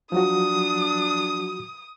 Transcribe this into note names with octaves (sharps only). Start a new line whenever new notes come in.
F3 F#3 D4 F#4 D#6